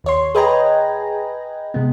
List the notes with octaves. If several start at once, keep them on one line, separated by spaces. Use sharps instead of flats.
D#2 C#5 C6
G#4 B4 D#5 G5 G#5 A#5
C3 G#3 B3